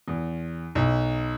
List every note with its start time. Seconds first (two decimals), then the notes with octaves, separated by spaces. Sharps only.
0.08 E2
0.75 B1